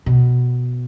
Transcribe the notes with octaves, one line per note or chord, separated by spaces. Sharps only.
B2